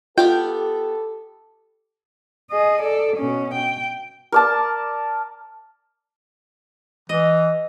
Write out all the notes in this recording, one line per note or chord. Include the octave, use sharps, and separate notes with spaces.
B3 F4 G4 A4 F5 G5
G#4 D#5
A4 D5
B2 C#4
G5
A#4 D5 A5
E3 D#5